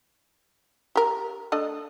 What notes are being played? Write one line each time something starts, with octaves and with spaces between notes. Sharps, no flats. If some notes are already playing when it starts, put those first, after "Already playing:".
G4 A#4
A3 D4 D#5